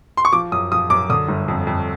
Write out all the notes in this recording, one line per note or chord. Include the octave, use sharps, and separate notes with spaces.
C6
C#6
F3 D6
F#2 D#6
F3 D#6
F#2 D6
D3 D#6
G1
F2
F2